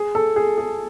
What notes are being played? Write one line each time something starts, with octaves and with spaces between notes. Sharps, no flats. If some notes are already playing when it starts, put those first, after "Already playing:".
Already playing: G#4
A4
G#4
G#4